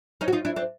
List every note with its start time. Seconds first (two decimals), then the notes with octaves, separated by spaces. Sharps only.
0.21 C#4 D#4
0.28 F#4
0.33 D#4 F4
0.45 D4 E4
0.56 C4 D4